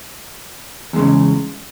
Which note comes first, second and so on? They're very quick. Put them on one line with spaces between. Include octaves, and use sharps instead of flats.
E2 G#3 C#3